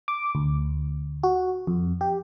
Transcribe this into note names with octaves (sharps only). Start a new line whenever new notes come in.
D6
D2
F#4
F2
G4